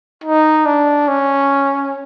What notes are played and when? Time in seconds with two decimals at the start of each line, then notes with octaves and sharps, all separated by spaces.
0.24 D#4
0.66 D4
1.08 C#4